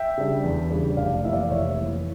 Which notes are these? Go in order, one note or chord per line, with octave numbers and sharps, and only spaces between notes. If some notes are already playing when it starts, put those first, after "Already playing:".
Already playing: E5 G5
C#3 G3 D4
E2
C#3 G3 D4
F1 D5 F5
F2 E3 A#3 E5
D5 F5
F1 C#5 E5
F2 E3 A#3